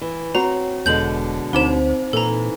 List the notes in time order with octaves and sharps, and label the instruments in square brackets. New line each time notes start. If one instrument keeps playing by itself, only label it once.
[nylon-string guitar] E3
[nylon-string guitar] C4 F#4 [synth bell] C#5 [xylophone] A#5
[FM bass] E1 [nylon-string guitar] B2 D3 G#3 [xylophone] G6 F#7
[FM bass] D2 [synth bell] C4 D#4 C5 [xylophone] E7 G7
[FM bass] A#2 [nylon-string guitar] E3 [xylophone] A4 A#5